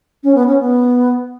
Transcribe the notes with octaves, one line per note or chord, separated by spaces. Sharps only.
C#4
B3
C#4
B3